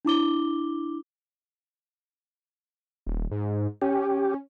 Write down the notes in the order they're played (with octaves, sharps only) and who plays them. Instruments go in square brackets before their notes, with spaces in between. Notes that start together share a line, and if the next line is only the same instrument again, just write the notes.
[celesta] D4 E4 D6 G7
[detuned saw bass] D#1
G#2
[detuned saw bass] C#4 [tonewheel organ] G4